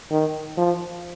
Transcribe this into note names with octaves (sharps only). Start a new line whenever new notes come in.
D#3
F3